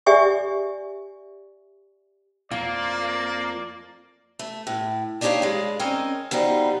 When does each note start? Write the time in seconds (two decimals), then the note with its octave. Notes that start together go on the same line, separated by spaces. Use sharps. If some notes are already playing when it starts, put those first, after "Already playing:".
0.06 G4 D5 E5 G#5 C#6
2.51 F2 A#3 F4 D5
4.39 A3
4.67 A2
5.21 D4 D#4 G4 G#4 C#5 F5
5.42 G2 G#3
5.79 C4 C#4 D#4 A#4 D#5
6.31 B2 F3 G3 D#4